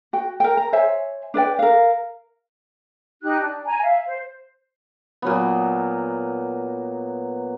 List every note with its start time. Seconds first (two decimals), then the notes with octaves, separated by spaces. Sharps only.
0.13 F#4 G5
0.40 A#4 G5
0.57 A#5
0.73 C5 C#5 E5 G#5
1.34 D4 B4 D5 G5
1.59 A#4 F5
3.22 D#4 G4 F#6
3.40 D4
3.65 G#5 A#5
3.82 E5 F5
4.06 C5
5.22 A#2 F#3 B3